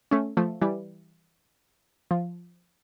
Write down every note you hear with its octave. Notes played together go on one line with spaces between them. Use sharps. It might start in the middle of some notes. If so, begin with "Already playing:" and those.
A3 C#4
F3 A3
E3 G3
F3